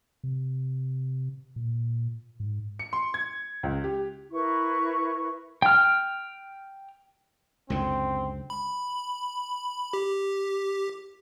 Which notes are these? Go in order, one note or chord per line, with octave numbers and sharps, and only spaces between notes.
C3
A#2
G#2
C#7
C6
G#6
C#2
G4
E4 A#4 B4 C#6
G5 F6
C#2 F#2 D3 C4
B5
G4